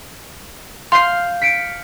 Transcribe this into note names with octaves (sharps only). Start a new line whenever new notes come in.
F5 C6 G6 C7
B6 C#7 D7